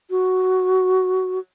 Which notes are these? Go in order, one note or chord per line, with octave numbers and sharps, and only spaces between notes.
F#4